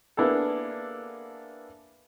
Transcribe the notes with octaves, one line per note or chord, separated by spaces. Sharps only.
A#3 B3 D4 E4 G#4 A4